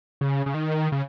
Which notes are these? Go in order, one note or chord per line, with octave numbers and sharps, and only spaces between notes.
C#3
C#3
D#3
C#3